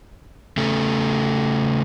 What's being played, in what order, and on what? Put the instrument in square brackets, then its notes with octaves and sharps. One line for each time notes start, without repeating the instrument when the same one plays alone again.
[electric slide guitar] C#3 A3 C#4 A4